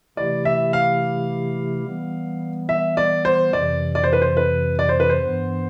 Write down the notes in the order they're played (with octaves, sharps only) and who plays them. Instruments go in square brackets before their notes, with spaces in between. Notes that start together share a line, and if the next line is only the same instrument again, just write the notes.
[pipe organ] C3 E3 A3 E4 G4 [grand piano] D5
[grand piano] E5
F5
[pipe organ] E3 G3 B3
[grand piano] E5
D5
C5
[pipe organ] F2 C3 E3 [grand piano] D5
[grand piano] D5
C5
B4
C5
B4
D5
C5
B4
C5
[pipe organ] G2 E3 B3